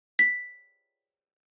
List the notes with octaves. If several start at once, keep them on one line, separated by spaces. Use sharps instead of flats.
B6